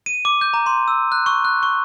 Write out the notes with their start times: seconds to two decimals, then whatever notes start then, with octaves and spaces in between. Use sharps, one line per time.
0.06 D#7
0.25 D6
0.41 G6
0.54 A#5
0.66 C6
0.88 E6
1.12 F#6
1.26 C#6
1.45 F#6
1.63 C#6